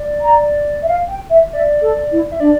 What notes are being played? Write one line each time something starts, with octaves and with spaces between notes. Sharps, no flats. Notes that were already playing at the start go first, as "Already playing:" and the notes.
Already playing: D5
A#5
E5
F5
G5
E5
D5 E5
A4
E4
E5
D4 D5